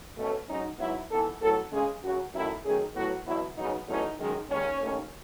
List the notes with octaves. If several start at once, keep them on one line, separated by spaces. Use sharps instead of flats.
B2 A3 C#4
G#2 F#3 C#4 D#4
G#2 F#3 B3 E4
G#2 E3 B3 A4
A2 F#3 B3 A4
C#3 G#3 C#4 G#4
F#2 C#3 F#3 F#4
F#2 D#3 F#3 A3 E4
F#2 D#3 A3 C#4 G#4
A2 F#3 B3 F#4
E2 B2 F#3 E4
C#3 F#3 B3 D#4
E2 B2 F#3 A3 C#4 D#4
F#2 D#3 G#3
D#2 D#3 G#3 C#4
D#2 D#3 A3 C#4